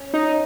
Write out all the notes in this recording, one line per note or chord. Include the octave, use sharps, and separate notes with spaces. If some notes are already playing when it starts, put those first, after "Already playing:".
Already playing: C#4
D#4